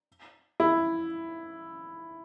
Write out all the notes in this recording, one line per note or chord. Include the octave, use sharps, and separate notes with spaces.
E4